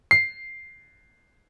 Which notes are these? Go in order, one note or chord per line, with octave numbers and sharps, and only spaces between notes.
C7